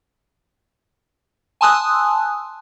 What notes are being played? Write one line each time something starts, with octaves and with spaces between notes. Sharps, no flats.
G#5 A5 C6 D#6 E6 F#6